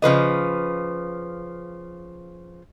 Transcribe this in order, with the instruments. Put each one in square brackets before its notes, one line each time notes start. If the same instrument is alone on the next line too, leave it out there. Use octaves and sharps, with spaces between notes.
[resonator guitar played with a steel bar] C#3 F3 B4 D#5